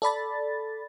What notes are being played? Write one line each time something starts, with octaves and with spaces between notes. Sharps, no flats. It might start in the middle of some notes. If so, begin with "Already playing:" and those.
A4 D5 B5 A6